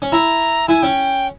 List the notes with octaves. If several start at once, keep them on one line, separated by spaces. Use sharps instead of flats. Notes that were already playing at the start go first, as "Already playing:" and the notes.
C#4
E4 A#5
E4 G#5
C#4 G5